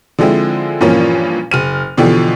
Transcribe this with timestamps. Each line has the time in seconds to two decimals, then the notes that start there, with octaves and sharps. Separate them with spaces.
0.19 D3 F3 G#3 C4 E4
0.81 G2 A#2 E3 F3 A#3 C#4
1.51 F#1 F6 D#7
1.98 B2 D3 E3 F3 G4